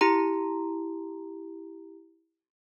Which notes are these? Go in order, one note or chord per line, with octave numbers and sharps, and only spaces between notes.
E4 G4 A#5